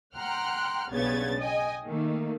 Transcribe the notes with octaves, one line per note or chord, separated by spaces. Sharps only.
F#5 G5 A#5 C6 F6 F#6
B1 G2 C#3 B3 G#6 A6
D#5 G5 G#5
D#3 A3 A#3